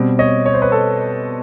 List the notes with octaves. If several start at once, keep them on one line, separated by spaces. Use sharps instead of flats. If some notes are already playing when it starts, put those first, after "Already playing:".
Already playing: B2 G3 C4
C#5 D#5
C#5
C5
B4 C#5
A4 B4